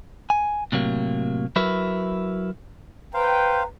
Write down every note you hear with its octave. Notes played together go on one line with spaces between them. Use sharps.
G#5
A2 C3 F#3 A#3
F#3 E4 F#4 A#4 B4
B4 C5 F5 G5 A#5